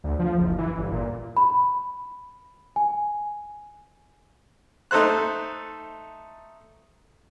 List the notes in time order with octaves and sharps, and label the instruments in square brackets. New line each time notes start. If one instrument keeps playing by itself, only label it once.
[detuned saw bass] D2
F3
F#1
E3
G1
A#2
[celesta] B5
G#5
[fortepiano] A3 D#4 A4 C5 F#6